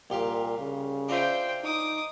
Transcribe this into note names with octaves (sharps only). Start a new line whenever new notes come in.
C2 A#2 G4 F5
C#3
D4 F4 C5 E5 G5
D#4 D6 D#6